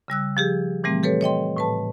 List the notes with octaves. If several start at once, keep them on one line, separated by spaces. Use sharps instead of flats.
C#3 G3 E6 F#6
F3 G4 G#4
A#2 E3 G3 A3 C4
G4 A4 B4 C#5
C#5 D#5 G5 C6
A2 B4 A5